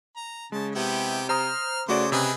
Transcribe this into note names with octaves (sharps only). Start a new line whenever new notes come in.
A#5
C#3 G#3 A5
C3 B3 E4 G4
C5 A#5 D#6 F6
C#3 A3 F#4 C5 D5 D6
C3 G#4 B4 D#5